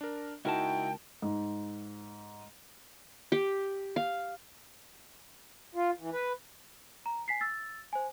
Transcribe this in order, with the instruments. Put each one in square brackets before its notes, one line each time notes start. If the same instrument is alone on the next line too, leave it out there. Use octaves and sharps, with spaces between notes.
[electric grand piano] D4 A#4
[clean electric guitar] C#2 A#4 A5 [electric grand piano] D#4 E4 F#4 [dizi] G5
[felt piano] G#2
[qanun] G4
F5
[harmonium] F4
E3
B4
[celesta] A#5
G#5 B6 C7
E6 A6
C5 G#5